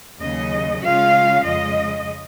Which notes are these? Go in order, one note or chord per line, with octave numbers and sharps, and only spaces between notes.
D#2 C#3 F#3 D#5
C#3 G#3 C#4 F4 F5
F2 C#3 G#3 D#5